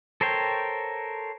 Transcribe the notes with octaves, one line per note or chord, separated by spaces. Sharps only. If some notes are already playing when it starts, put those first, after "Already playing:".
A4 A#4 C5 C#5 G5